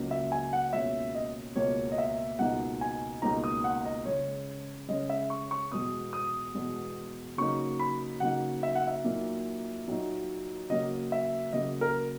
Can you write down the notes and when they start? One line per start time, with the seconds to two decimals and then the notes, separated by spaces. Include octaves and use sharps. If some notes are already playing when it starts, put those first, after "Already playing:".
Already playing: C#2 C#3 F#3 A#3
0.11 E5
0.32 G#5
0.53 F#5
0.73 C#2 B2 A#3 C#4 E5
1.15 D#5
1.55 C#2 B2 A#3 C#4 C#5
1.92 D#5
1.98 E5
2.39 C#2 B2 A#3 D#4 F#5
2.81 G#5
3.22 C#2 B2 A#3 D#4 A#5
3.44 D#6
3.64 F#5
3.85 D#5
4.05 C#3 G#3 C#4 C#5
4.88 C#3 G#3 C#4 D#5
5.10 E5
5.30 C#6
5.51 C#6
5.72 E2 B2 G#3 D#6
6.13 D#6
6.55 E2 B2 G#3
7.38 C#3 F#3 A#3 D#4 C#6
7.79 B5
8.20 C#3 F#3 A#3 D#4 F#5
8.63 E5
8.75 F#5
8.88 E5
9.04 A#2 F#3 A#3 D#4
9.88 A#2 F#3 A#3 D#4
10.70 C#3 F#3 A#3 D#5
11.12 E5
11.53 C#3 F#3 A#3 D#5
11.81 A#4